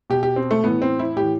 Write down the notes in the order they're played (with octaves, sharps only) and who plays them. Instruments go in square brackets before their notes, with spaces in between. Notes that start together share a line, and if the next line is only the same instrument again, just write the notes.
[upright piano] B2 G4
G4
C4
A3
A2 E3 B3
C4
E4
A2 E3 G4